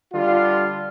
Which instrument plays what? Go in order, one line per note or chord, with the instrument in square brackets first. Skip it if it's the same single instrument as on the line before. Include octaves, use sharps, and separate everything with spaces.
[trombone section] D3 G3 F4